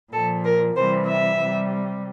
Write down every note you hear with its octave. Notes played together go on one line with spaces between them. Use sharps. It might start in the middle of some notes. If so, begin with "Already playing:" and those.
A#2 F3 A4
A#4
C3 E3 G3 C5
E5
C3 G3